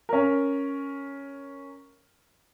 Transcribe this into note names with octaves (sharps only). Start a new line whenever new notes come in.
C#4 A#4